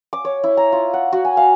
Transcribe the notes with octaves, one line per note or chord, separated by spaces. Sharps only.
D6
C#5
E4
A#5
F4
F#5
F#4
G#5
F5